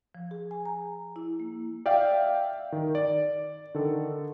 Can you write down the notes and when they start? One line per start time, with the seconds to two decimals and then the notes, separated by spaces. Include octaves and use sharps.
0.15 F3
0.31 G#4
0.51 G#5
0.65 A#5
1.16 E4
1.40 A#3
1.86 D5 E5 F5 G5
2.72 D#3
2.95 D5
3.75 D3 D#3 A4